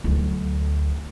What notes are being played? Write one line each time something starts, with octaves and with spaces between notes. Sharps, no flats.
D2 F#3